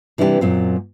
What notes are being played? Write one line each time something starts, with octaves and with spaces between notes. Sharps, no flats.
C3 E3 G3 D4 E4 G4
F#2 A#2 F#3 C4